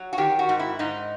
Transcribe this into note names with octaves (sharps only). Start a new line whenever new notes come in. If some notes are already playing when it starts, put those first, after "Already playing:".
Already playing: F#3
F#4
D#3 G4
F#4
G#2
E4
G#2 D#4